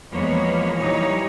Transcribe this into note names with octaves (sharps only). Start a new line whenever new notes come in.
E2 F3 G#3 A#3 B3 C#5
A#2 E3 F3 G3 D#4 C#5